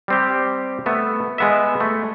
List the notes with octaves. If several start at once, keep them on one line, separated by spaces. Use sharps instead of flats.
G3 C4 G4
A3 B3 E5
G#3 B3 E5
A3